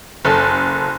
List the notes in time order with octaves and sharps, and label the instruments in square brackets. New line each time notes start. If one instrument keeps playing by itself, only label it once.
[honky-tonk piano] F#1 A4